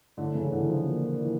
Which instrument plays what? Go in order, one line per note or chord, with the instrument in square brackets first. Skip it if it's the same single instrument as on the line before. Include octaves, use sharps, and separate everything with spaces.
[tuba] A2 [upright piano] D3
[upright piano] C#3
E3
D3
F3
[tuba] A#2
[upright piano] E3